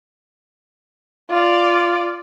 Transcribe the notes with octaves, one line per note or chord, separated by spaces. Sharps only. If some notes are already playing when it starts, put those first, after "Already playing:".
F4 D5